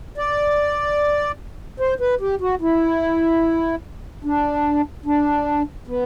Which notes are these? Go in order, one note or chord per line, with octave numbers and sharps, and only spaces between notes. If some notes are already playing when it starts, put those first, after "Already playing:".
D5
C5
B4
G4
F#4
E4
D4
D4
B3